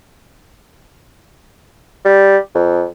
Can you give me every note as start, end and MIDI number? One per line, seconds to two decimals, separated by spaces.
2.05 2.37 55
2.55 2.85 41